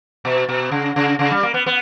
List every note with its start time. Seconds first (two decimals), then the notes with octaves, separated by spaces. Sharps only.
0.25 B2
0.49 B2
0.71 C#3
0.96 C#3
1.19 C#3
1.31 G3
1.43 A#3
1.54 B3
1.66 B3